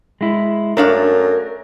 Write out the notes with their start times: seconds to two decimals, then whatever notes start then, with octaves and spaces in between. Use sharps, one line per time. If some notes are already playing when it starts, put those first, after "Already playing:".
0.21 G#3 E4
0.77 F#2 A3 D4 A#4 F5